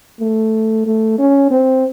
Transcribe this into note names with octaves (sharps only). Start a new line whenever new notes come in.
A3
A3
C#4
C4